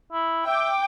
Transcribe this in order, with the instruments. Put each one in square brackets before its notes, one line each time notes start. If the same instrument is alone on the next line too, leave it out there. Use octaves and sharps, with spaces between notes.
[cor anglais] E4
[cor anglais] E5 [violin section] G5 D6